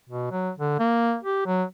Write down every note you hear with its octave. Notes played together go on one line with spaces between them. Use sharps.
B2
F#3
D3
A#3
G4
F#3